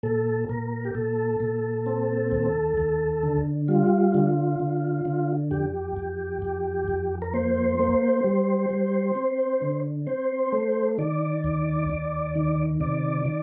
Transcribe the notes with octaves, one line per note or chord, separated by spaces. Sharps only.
A#2 A4
A#2 A#4
G4
A#2 A4
A#2
C4
D#2
D#2
D3
G3 F4
D3
D3
D3
F2 G4
F2
F2
F2
A#4
A#3 C5
A#3
G3
G3
C4
D3
C4 C5
A3
D#3 D5
D#2
D#2
D#3
C3 D5
D#3